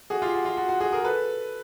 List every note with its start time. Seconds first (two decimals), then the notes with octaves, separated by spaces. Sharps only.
0.10 F#4 G#4
0.22 F4 G4
0.34 F#4
0.45 F4
0.57 F#4
0.69 F#4
0.80 F#4 G#4
0.92 G#4 A#4
1.05 A4 B4